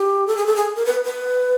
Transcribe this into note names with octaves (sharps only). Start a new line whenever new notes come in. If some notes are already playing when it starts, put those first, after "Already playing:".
Already playing: G4
A4
G#4
A4
G#4
A#4
B4
B4